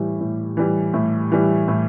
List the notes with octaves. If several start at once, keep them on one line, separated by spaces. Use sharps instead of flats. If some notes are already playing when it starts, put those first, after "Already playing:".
Already playing: A2 E3 G3
A2
E3 G3
A2
E3 G3
A2